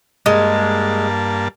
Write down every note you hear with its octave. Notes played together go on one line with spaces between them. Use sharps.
G2 G#3 A#3 A5